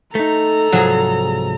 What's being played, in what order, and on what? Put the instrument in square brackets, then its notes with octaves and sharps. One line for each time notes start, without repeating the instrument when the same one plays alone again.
[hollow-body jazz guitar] A3 D#4 [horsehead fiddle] A4 [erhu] A#5
[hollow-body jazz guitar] C2 G#2 F3 [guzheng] F#3 G#4